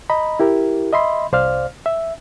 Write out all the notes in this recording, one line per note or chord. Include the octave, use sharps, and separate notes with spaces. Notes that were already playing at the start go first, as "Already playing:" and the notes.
D#5 A#5 B5
E4 G4 A#4
D#5 E5 B5 C6
C2 C5 D5 F5 F6
E5